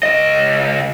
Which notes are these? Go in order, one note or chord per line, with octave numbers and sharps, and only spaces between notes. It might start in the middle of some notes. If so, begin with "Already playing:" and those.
C#2 D#5